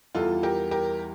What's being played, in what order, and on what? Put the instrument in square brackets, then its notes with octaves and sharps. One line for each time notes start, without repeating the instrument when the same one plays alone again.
[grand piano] E2 E3 G3 F4 A4
G4 A#4
G4 A#4